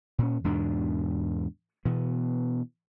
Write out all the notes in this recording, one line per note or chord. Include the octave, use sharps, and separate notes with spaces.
A#2 C#4
E2 G#2 B2 D4
B2 E3 B3